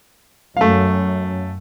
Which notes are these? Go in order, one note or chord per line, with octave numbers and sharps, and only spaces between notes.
F#2 A3 F5